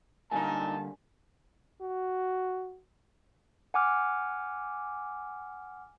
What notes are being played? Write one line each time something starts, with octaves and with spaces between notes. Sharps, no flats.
A#2 D3 G3 A#3 D#4 G#5 A5
F#4
F#5 G#5 D6 F6